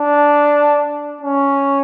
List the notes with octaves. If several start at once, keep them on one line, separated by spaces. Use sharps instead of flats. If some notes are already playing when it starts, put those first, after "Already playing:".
Already playing: D4
C#4